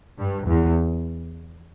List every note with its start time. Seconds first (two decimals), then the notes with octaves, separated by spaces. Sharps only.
0.19 G2
0.47 E2